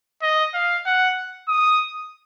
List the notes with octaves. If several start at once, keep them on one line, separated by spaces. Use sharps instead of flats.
D#5
F5
F#5
D#6